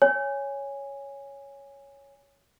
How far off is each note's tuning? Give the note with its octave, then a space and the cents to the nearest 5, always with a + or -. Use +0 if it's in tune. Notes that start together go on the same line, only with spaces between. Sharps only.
C#5 +5 G#5 -10